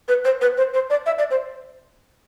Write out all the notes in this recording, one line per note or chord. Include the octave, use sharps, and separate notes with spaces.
B4
C5
B4
C5
C5
D5
E5
D5
C5